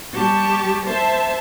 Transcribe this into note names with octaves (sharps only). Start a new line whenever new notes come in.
G3 G4 A5 C#6
C5 E5 A5